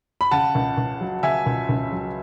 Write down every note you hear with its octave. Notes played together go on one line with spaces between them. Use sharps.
B5
C#3 F#5 A5
C#2
C#2
F#3
C#3 E5 G#5
C#2
C#2
F#3